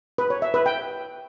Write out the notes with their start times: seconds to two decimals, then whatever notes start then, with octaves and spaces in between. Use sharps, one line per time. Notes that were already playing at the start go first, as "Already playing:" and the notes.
0.18 B4
0.30 C#5
0.42 E5
0.54 B4
0.66 G5